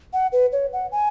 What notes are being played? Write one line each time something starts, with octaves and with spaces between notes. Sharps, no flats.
F#5
B4
C#5
F#5
G#5